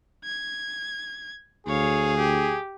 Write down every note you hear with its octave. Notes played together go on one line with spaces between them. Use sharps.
G#6
D2 G#4 C#5 F5
G4